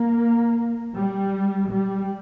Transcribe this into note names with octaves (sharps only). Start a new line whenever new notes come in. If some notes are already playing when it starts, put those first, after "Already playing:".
Already playing: A#3
G3
G3